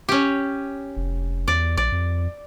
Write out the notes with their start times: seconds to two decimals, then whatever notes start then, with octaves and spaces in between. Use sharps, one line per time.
0.09 C#4 G4
0.97 F1
1.48 E2 D5
1.77 A#1 D5
1.92 F2